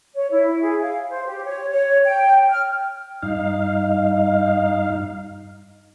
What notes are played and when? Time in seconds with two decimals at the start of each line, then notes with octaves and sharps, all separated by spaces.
0.15 C#5
0.31 E4
0.62 G#4
0.81 F5
1.10 C5
1.26 G4
1.45 C#5
1.70 C#5
2.04 G5
2.50 F6
3.22 G2 D#4 F5